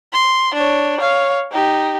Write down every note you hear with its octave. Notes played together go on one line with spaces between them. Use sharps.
C6
D4 C#5
C#5 F5
D#4 G4